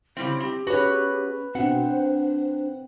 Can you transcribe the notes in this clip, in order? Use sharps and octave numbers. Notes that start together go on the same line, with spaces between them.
C#3 G3 C4 E4
C4 G4
C#4 F#4 G#4 B4 C#5
B2 C4 D4 F#4 F#5
C5